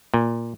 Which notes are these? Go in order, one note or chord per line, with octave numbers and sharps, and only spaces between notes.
A#2